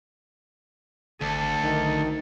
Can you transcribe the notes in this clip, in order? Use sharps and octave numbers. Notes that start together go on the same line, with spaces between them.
G#1 D2 A4
B1 D#3